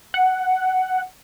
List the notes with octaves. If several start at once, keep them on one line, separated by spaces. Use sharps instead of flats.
F#5